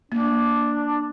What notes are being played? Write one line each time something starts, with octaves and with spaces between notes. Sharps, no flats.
A#3 D4